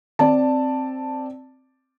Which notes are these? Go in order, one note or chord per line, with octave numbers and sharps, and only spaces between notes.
C4 D5 A5